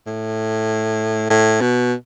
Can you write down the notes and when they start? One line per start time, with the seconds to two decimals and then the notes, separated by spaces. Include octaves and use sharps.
0.07 A2
1.30 A2
1.61 B2